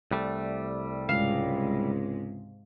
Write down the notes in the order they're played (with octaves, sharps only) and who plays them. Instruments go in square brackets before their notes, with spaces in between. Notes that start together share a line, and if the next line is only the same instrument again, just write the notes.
[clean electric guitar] C2 G3 A3
[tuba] C#2 [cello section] G#2 C3 G#3 [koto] F5